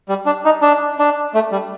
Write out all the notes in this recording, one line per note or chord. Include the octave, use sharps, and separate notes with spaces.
G3
D4
D#4
D4
D4
A3
G3